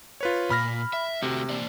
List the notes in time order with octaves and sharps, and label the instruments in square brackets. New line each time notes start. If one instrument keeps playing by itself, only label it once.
[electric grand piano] F4 B4 C#5
[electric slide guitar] A#2 [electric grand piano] B5 F6 A#6
[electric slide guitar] E5
[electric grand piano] C3 [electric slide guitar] A3 F#4
[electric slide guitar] A#3 C5 D5